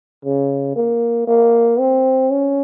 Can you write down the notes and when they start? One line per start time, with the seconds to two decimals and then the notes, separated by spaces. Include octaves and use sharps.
0.25 C#3
0.76 A#3
1.27 A#3
1.79 C4
2.31 C#4